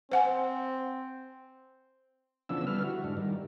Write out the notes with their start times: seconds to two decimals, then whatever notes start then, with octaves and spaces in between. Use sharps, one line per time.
0.12 C4 C5 F#5 G#5
2.49 C#3 E3 F3 B3 D4 E6
2.67 D3 G3 B4 F6
2.84 E4 F#4
3.04 G#2 D4
3.17 D#3 G3